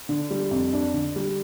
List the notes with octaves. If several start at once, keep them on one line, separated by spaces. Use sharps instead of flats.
D3
G3
F2
D4
D3
G3